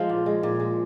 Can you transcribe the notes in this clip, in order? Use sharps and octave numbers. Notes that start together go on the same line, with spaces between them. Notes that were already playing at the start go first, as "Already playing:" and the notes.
Already playing: F3 G#3 F4
A#2
G#3
A#2
G#3